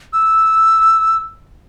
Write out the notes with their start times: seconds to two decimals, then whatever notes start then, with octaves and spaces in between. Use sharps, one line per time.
0.13 E6